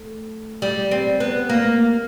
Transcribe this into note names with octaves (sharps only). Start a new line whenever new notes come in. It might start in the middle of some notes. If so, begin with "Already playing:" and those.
Already playing: A3
G3
C4
B3
A#3